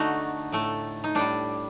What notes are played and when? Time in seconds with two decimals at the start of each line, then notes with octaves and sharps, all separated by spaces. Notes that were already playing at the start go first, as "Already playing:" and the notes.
Already playing: D3 A3 D#4 F#4
0.52 A2 A3
1.04 D#4
1.15 A2 G3 D4